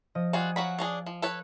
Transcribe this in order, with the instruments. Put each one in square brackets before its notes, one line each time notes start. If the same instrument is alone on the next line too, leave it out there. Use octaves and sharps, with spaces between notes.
[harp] F3 D#5 D#6
[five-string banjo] G3 F4 F#4 [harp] G#5
[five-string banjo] F#3 F#4 B5 [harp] F5
[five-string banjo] C#4 D4 G#4
F3
A4 B4 C#5